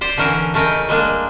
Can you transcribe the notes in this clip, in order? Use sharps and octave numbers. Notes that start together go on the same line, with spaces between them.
G4 C5 D5
D3 E3 C#4 A#4
C#3 A3 A#4 D#5 G5
G3 G#3 A#3 D4